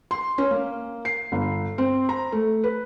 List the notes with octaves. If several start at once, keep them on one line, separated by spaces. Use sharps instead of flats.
C6
C#4
A#3
C7
G1
C4
A#5
A3
B4